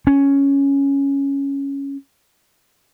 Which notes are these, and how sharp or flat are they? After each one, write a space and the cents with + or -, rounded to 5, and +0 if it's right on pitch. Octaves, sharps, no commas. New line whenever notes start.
C#4 +0